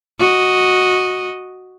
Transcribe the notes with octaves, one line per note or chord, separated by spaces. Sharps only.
F#4 D#5